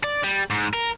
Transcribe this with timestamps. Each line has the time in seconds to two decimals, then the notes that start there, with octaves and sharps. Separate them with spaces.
0.04 D5
0.23 G3
0.50 G#2
0.73 A#4